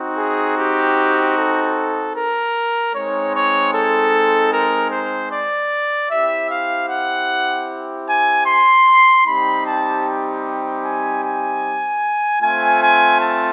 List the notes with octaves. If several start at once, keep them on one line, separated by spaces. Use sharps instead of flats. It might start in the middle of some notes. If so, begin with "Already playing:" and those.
Already playing: C4 D#4 F#4
G#4
G4
A4
A#4
G#3 C4 D#4 C#5
C#5
A4
A#4
C5
D5
C4 E4 G4 E5
F5
F#5
G#5
C6
G3 C4 D#4 G4 B5
A5
G#5
G#5
A3 C4 F4 G#5
G#5
A5